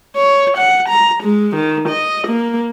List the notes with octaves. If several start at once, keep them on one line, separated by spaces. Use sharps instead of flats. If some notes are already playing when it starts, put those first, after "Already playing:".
C#5
F#5
A#5
G#3
D#3
D#5
A#3